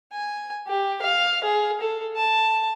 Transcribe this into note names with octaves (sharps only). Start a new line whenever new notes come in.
G#5
G4
F5
G#4
A4
A5